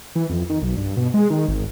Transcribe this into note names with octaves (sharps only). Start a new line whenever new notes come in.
E3
F2
D#3
B1
G2
B2
G#3
D#3
G#1